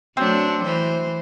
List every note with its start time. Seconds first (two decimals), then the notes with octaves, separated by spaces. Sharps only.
0.17 F#3 A3 C4 D4
0.64 E3 C5